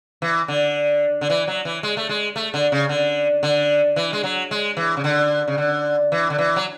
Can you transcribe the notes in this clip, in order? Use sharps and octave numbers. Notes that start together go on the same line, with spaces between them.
E3
D3
D3
E3
F#3
E3
G#3
A3
G#3
A3
D3
C#3
D3
D3
E3
G#3
F#3
G#3
E3
C#3
D3
C#3
D3
E3
D3
E3
F#3